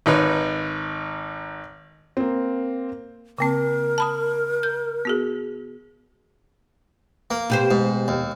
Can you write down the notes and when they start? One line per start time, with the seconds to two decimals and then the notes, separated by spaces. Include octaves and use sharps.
0.06 G#1 D#4 B4 C#5
2.17 A#3 C4
3.38 C#3 A#3 C4 A#4
3.98 A5 B5 D#6
4.63 G6
5.05 B3 F#4 G#4
7.31 A#3
7.50 B2 G4 C5
7.71 G#2
8.08 D#2